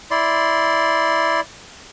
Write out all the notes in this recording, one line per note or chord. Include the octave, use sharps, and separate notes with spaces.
E4 D5 C6